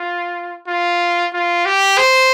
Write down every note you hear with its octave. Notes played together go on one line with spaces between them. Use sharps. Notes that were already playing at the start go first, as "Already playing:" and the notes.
Already playing: F4
F4
F4
G4
C5